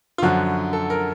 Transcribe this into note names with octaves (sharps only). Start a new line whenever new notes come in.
F4
F#2 D3 F3 F#4
A4
A#4